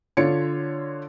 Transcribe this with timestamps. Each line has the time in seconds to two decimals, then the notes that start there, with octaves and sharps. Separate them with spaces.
0.17 D3 F4 C#5 C#7